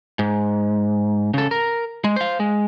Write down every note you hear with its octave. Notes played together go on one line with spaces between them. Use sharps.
G#2
C#3 A4
A#4
G#3
C5 F5
G#3